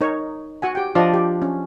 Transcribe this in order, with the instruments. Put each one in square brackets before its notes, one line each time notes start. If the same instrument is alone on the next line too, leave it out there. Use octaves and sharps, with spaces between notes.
[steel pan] D#4 A#4 C#5
F#4 F#5 G#5
G4 G5
[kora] F3 D4 [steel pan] D5 D#5
[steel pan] G4
C#4